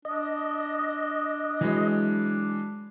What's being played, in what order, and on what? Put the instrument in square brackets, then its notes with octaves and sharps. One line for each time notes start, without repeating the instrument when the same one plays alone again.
[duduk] D4 [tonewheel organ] D#5
[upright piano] E3 F#3 G#3